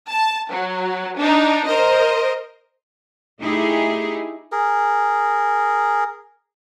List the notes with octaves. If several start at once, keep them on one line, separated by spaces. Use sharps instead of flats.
A5
F#3
D4 D#4
A#4 C5 D#5
A3 D#4 E4 G4 G#4
G#4 A#4